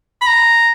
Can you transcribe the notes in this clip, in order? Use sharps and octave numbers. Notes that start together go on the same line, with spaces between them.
B5
A#5